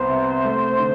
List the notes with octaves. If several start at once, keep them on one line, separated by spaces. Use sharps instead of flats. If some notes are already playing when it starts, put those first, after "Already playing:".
Already playing: C2 B3 C5
C3
A3
D3